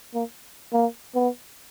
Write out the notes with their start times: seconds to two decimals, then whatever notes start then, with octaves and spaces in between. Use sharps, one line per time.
0.14 A#3
0.73 A#3
1.15 B3